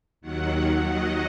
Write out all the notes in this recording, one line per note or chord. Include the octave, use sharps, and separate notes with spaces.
D#2 D#3 F#3 F#5
D#5